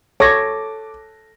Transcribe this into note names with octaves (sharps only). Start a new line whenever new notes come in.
A4 C#5 D6 A#6